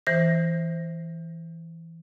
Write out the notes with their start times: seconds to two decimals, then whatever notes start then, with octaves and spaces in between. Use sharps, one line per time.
0.07 E3 C5 A#6